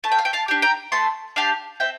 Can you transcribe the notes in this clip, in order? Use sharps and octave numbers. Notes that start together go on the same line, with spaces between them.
A3 A5
G5
F5
E5 G5
F5 A5
D4 G4
G5 A#5
A3 A5 C6
D4 G4 F5 A5
C4 E5 G5